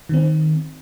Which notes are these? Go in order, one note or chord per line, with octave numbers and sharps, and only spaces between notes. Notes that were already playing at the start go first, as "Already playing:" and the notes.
D#3 C4